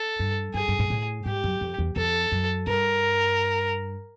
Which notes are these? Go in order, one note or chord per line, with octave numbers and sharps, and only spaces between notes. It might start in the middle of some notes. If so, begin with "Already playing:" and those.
Already playing: A4
G2
G2 G#4
G2
G#2
A2
G#2 G4
F#2
F2
E2
F2 A4
F#2
G2 A#4